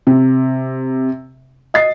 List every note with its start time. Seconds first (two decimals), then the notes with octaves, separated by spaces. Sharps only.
0.07 C3
1.74 D#5 A6 C7